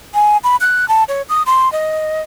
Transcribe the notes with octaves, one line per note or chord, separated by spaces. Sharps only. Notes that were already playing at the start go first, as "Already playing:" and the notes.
G#5
B5
F#6
A5
C#5
D#6
C6
D#5